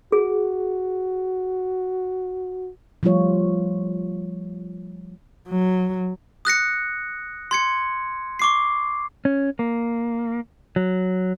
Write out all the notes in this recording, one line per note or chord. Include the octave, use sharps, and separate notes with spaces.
F#4 G#4
F3 G3 A3 F4 C#5
F#3
D#6 F#6 A#6 C#7
C6 G#6 C#7
C#6 D6 C7
C#4
A#3
F#3